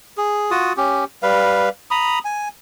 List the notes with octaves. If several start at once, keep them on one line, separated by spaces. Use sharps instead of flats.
G#4
F4 F#4 D#6
C#4 G4
G3 B4 F5
A#5 B5 D#6
G#5